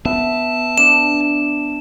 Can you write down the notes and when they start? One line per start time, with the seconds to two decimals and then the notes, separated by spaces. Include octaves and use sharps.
0.05 B3 E5 A5
0.78 D4 E7